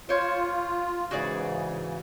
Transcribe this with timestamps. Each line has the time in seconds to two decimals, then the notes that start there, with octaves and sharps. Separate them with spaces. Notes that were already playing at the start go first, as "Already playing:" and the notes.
0.09 F4 C5 C#5
1.11 G#2 C#3 E3 F#4 G#4 D5